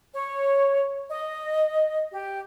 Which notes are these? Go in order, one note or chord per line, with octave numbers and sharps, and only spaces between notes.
C#5
D#5
G4